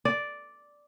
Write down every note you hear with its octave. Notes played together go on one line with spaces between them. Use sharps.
D5